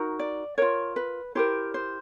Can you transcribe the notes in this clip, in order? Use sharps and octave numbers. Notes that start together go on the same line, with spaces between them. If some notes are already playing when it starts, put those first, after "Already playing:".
Already playing: D#4 F#4 A#4
D5
F4 A#4 C#5
B4
E4 G4 A#4 C5
C5